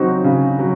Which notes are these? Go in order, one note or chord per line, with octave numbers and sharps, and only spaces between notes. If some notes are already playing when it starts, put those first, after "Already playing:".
Already playing: C#3 F#3 C4 D#4 F#4
C#3
F#3